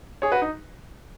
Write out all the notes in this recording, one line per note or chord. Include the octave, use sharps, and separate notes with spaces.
G#4 C#5
F#4 B4
D#4